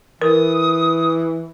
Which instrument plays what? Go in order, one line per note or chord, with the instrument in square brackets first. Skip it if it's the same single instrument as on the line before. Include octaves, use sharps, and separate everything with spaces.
[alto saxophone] E3 [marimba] A#4 [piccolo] D#6